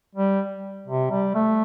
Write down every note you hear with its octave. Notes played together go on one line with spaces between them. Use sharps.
G3
C3
G3
A3